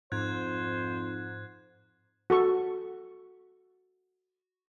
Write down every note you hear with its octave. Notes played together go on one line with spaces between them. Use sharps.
F2 G#2 C5 F#6 G#6
F#4 A4 C#6